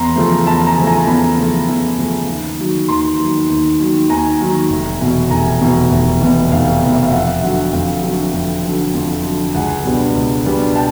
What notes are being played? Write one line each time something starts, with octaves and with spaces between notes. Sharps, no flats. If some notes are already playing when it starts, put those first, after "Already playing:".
Already playing: E2 A#5 C6
C#3 F3 A3
E2 A5 B5
G#5 A#5
C#3 F3 A3
G#5 A#5
E2 A5 B5
C#3 F3 A3
E2
C#3 F3 A3
D#2
D#3 F#3
D#2 A#5 C6
D#3 F#3
D#2
D#3 F#3
D#2 G#5 A#5
D#3 F#3
F1
E2 B2
F1 G#5 A#5
E2 B2
F1
E2 B2
F1 F5
E2 B2
E5
F5
F2 E5 F#5
D3 F#3 E5 F#5
F2 F5 G5
D3 F#3
F2
D3 F#3
F2
D3 F#3
C#2 F#5 G#5
B2 G3 B3 D4
C#2
B2 G3 B3 D4
G5 A5